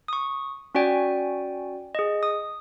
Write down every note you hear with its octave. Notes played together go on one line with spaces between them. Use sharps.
C#6 D#6
C#4 F#4 D5 G5 G#5
G#4 D#5
D#6